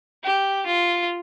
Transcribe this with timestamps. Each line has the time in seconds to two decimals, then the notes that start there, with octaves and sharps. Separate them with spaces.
0.24 G4
0.66 F4